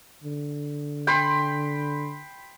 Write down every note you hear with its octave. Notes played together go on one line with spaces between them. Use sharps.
D3
G5 B5 C6